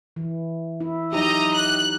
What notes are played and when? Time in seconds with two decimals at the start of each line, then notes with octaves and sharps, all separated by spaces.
0.16 E3
0.80 E4
1.13 F#3 D#4 G4 D#5 A#5
1.54 F#6